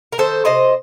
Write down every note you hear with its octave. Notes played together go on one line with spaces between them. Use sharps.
A#4
D#3 A4 C5
C3 C5 D#5